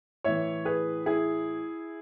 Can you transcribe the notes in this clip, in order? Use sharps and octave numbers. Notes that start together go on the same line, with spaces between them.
A2 E3 C#5 E5
G#4 B4
E4 G#4